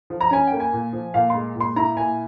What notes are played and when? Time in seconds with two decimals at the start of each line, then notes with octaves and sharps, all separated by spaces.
0.10 F3
0.21 A#5
0.30 C#4 G#5
0.47 A#3 G5
0.60 G#5
0.73 A#2
0.93 F3
1.14 A#2 F5
1.30 G#3 C6
1.55 A#2
1.60 C6
1.76 E4 A#5
1.96 A#2 G#5